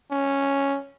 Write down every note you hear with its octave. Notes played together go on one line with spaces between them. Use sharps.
C#4